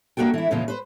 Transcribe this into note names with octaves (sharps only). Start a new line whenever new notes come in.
A#3 D4 F#4 A4 G5
E3 E4
F2 A#2 C#3 E3 F3 F4
B4 C5